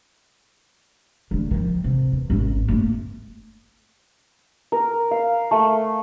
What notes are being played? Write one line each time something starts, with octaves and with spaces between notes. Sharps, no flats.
D3 A3
D#3 F3
C3
E2
G#1 C#4
F#1 A3
A#4
F5
A3